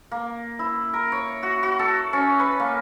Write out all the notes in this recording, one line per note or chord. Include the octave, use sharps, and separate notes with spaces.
A#3
E4
A#4
C#5
F#4
F#4
A4
C#4
B4
A#3